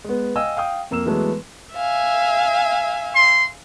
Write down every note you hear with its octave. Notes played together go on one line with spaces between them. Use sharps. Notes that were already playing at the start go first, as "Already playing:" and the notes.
G#3 B3
D#5 F5 G5 G#5 E6
F5 G5 D#6
F2 A#3 E6 E7
E3 F#3 G#3 A3 B3
E5 F5 G#5
C6